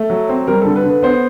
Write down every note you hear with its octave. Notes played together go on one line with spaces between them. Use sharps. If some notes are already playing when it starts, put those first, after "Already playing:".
Already playing: A3
F#3
C4
G3 A#4
D3 A4
B4
D3
B4
B3 C5